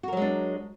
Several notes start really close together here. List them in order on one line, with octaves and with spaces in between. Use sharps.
F#4 A#4 F#3 G#3 D4